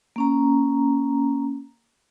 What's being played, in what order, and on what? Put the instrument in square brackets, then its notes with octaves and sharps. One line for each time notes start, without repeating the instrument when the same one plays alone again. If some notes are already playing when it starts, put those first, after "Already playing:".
[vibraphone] A#3 C#4 A#5